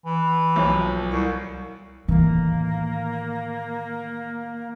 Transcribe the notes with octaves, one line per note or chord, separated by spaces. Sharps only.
E3
B1 F3
C2 C#6
A2 D#3 E3 A#3